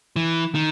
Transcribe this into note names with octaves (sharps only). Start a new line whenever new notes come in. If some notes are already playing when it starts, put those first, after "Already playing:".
E3
D#3